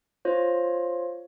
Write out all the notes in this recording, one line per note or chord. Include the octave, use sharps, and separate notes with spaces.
F4 C5 C#5